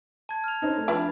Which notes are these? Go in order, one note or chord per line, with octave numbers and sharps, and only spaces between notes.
A5 G#6
F6 F7
C4 C#4 D#4
A3
F3 D4 E4 B4 A5